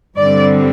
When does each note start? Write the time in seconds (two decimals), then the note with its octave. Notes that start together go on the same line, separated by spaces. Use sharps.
0.17 G2 D3 G3 C4 D5